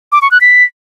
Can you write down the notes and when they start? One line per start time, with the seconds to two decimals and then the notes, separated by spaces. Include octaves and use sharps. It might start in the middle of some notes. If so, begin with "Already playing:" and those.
0.12 D6
0.22 C#6
0.31 F#6
0.41 B6